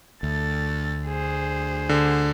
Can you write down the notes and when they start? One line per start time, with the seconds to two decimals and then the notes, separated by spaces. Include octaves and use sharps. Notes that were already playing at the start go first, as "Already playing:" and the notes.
0.23 D2 A4 A6
1.06 G#4 C5
1.89 D3